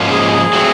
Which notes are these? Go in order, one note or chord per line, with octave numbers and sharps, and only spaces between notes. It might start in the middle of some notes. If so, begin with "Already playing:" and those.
Already playing: G#2 F3 A#3 C#4 F4
G#4
G#4
F#3 A3 C4